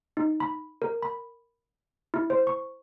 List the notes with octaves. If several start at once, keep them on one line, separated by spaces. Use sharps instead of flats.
D#4
B5
A#4
B5
E4
C5
C#6